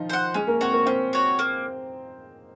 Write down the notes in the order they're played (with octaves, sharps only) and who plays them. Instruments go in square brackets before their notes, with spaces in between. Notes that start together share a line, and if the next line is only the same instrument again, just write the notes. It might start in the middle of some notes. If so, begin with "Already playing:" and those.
Already playing: [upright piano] D#3 F3 D#4 F4
[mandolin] C5 F#5
[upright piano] G#3 G#4 [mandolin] C#4
[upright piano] A#3 A#4
[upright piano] C4 C5 [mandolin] F#4 C#5
[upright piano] A#3 A#4
[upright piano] C4 C5 [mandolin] C#4
[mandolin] F#4 C#5
A#3